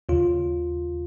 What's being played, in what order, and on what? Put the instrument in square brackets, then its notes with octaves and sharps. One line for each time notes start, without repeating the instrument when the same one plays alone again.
[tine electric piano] D#2 C#3 F4